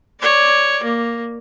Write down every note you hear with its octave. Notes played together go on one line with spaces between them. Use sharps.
C#5 D5
A#3